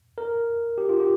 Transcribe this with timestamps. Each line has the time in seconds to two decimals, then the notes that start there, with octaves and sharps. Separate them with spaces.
0.18 A#4
0.78 G4
0.89 F4
1.00 G4